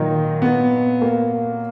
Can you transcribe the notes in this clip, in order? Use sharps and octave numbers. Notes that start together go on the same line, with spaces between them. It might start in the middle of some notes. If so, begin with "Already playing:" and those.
Already playing: A#2 D#3 F#3 D#4
B3
A#3